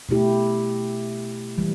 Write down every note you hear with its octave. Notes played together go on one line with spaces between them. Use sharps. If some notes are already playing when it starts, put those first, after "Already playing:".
B2 A3 E4 G4
E3 G3